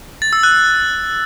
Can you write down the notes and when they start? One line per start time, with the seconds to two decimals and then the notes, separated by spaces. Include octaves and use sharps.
0.22 A6
0.33 E6
0.43 F#6